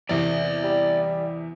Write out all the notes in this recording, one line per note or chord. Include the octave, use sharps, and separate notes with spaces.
E2 C3 D5 E5
G3